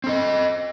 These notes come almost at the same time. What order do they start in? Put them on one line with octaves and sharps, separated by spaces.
C4 A4 D#5